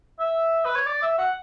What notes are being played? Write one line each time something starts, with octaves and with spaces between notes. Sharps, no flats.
E5
B4
C#5
D5
E5
F#5